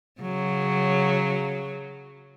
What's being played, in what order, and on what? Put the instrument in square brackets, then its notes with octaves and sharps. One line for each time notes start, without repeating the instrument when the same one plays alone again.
[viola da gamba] C#3 F#3